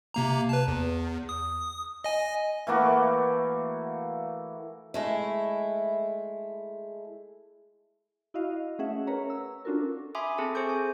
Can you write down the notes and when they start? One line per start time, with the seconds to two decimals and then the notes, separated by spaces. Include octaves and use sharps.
0.14 C3 A#3 A#5
0.49 B4 A5
0.68 E2
1.29 D#6
2.04 D#5 G#5
2.67 E3 A3 A#3 F#4
4.94 G#3 A3 E4
8.34 E4 F#4 D#5 F5
8.79 A3 C#4 G#4 E5 F#5
9.07 C#4 A#4 B4 C#5 A#5
9.30 E6
9.65 C#4 D4 F4 F#4 A4 A#4
10.15 E5 G#5 B5 C6 D6 D#6
10.38 C4 G#4 A4 A5
10.55 G#4 C5 G#5 C#6 G6
10.69 G#5